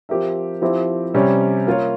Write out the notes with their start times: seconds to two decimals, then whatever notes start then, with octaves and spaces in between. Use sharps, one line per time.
0.09 F3 C4 G4 A#4 E5
0.62 F3 C4 E4 G4
1.14 C3 G3 C#4 G4 C#5
1.67 A#3 F4 A#4 C#5